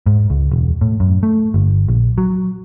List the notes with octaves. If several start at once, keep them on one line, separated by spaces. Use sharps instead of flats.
G#2
C#2
E1
A2
F#2
A3
G1
A#1
F#3